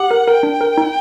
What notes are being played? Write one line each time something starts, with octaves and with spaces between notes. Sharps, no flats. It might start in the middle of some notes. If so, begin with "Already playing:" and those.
Already playing: G4 F#5
A#4
A#4 G5
D4
A#4
D#4